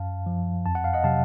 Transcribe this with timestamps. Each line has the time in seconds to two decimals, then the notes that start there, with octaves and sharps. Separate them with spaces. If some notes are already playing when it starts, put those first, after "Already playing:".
Already playing: F#2 F5 A5
0.26 F3
0.66 F2 A5
0.75 F#5
0.84 F5
0.93 D#5 F#5
1.04 C3 F#3 F5 A5